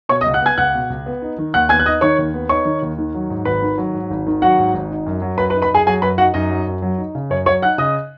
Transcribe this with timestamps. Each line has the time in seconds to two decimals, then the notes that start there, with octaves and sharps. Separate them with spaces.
0.09 B2 C#5 C#6
0.21 D#5 D#6
0.26 C#2
0.34 F#5 F#6
0.42 B3 G#5 G#6
0.58 C#2 F#5 F#6
0.74 B2
0.90 C#2
1.06 B3
1.22 D#4
1.38 D#3
1.54 D#2 F#5 F#6
1.69 B3 G#5 G#6
1.80 F#6
1.85 D#4 D#5 D#6
2.01 D#3 C#5 C#6
2.18 D#2
2.34 B3
2.49 D#4 C#5 C#6
2.65 D#3
2.82 D#2
2.99 D#3
3.14 F#3
3.30 G#2
3.45 G#1 B4 B5
3.62 D#3
3.78 F#3
3.94 G#2
4.11 G#1
4.26 D#3
4.42 F#3 F#4 F#5
4.59 G#2
4.74 G#1
4.91 D#4
5.06 F#2
5.22 F#3
5.38 F#2 B4 B5
5.50 B4 B5
5.54 D#4
5.62 B4 B5
5.70 F#2 G#4 G#5
5.86 F#3 G#4 G#5
6.02 F#2 B4 B5
6.18 D#4 F#4 F#5
6.34 F#2 D#4 D#5
6.51 F#3
6.67 F#2
6.82 F#3
6.98 D#4
7.15 C#3
7.30 F#2 C#5
7.46 F#3 C#5 C#6
7.62 D#4 F#5 F#6
7.78 C#3 D#5 D#6